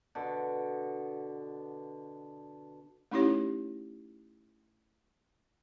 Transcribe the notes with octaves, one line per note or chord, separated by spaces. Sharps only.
B2 D3
A3 C#4 D#4 E4 G4 C#5